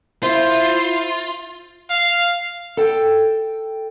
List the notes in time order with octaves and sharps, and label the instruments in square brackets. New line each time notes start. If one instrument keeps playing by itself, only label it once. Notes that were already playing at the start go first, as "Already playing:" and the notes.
[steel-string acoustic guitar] E4 E5 [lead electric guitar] F4 [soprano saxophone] C5
[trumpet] F5
[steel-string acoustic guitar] A4 G5